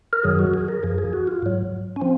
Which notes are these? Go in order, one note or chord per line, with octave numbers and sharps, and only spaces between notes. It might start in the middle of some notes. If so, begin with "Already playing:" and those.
A#4
F#2 D#3 F#3 G#4
F#4
G#4
A#4
F#2 F3 G#4
G#4
F#4
F4
G#2 F#3
C#4
F3 C4